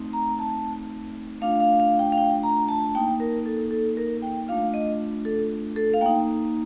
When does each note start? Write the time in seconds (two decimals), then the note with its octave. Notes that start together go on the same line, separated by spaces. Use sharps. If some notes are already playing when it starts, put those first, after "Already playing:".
Already playing: A3 C4 D#4
0.13 A#5
0.39 A5
1.41 A3 D4 F4 F5
1.60 F5
1.80 F5
1.99 G5
2.12 F5
2.18 G5
2.43 A#5
2.69 A5
2.86 A5
2.95 A#3 D#4 G5
3.20 A#4
3.46 A4
3.71 A4
3.97 A#4
4.22 G5
4.48 A3 D4 F4 F5
4.74 D#5
5.25 A4
5.76 A4
5.94 F5
6.01 A#3 D#4 G5